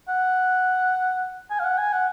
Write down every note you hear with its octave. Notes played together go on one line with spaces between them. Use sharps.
F#5
G#5
F5
F#5
G#5
F#5